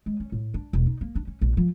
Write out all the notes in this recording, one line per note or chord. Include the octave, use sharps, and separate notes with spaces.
G#3
C#4
A2
D4
E1
D#4
A#3
D4
C#4
A#1
F3